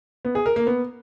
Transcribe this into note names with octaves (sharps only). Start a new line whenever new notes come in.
B3
G#4
A#4
A#3
B3